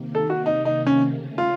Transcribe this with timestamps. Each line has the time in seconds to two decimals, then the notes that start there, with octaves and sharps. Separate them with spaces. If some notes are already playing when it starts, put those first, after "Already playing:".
Already playing: C3 D#3 A#3
0.15 A4
0.30 F#4
0.46 D#4
0.65 D#4
0.87 C#4
1.08 C#3 A3 C#4
1.38 F4